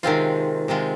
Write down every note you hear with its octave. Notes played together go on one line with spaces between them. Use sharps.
C3 D#3 G#3 C4 F4
C3 D#3 G#3 C4 F4